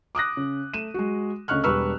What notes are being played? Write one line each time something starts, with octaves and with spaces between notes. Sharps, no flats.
D6 D#6 F#6 A#6
C#3
A3 D#7 E7
G#3 F#4
D2 C#3 D#5 C#6 F6 F#6
E1 G3 B4 C#6 E6 F6